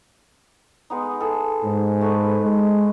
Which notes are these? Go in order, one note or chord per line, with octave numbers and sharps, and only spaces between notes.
G#3 B3 D#4
G#4 A4
G#2
A3 A4 B4
G#3